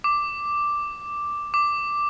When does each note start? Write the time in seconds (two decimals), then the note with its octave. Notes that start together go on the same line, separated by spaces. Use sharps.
0.04 D6
1.54 D6